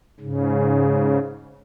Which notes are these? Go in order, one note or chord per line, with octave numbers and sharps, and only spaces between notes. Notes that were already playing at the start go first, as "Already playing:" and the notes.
G#2 C#3